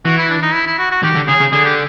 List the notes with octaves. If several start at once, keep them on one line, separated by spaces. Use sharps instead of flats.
E3 F#4
E4
D4
D#4
E4
E4
F#4
F#4
D#3 G4
D3
C#3 G#4
C#3
D3 G#4
G4